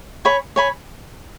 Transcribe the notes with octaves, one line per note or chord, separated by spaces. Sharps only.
C#5 G#5 B5
C#5 G#5 B5